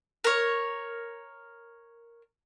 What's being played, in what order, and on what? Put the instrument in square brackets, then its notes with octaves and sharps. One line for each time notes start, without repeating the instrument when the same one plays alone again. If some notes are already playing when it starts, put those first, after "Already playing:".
[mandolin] A#4 C#5